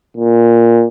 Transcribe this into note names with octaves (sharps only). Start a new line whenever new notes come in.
A#2